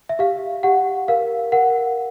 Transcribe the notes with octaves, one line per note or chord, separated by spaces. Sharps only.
E5
G4 F5
G4 F#5
A#4 F5
A#4 F#5